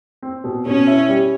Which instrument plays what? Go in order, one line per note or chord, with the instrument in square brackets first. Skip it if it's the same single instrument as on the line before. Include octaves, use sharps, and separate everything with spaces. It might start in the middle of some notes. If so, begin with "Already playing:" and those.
[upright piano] C4
B2
[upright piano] B2 [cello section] C#4
[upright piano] E4
G3